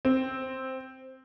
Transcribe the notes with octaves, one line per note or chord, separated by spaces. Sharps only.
C4